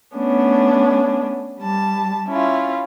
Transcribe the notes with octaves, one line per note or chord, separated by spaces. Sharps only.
A3 B3 C#4 D4
G3 A5
C#4 E4 F4